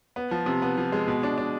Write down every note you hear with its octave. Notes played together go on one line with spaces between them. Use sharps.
B3
F3
C3
B3
F3
G#3
B2
D4
D4